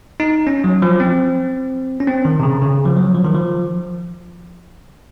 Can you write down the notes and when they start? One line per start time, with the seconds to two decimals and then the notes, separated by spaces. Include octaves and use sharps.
0.20 D#4
0.47 C#4
0.64 F#3
0.82 F3
1.00 C4
2.00 C#4
2.07 C4
2.25 D#3
2.40 C3
2.43 C#3
2.62 C#3
2.86 F3
2.97 F#3
3.14 F3
3.25 D#3
3.35 F3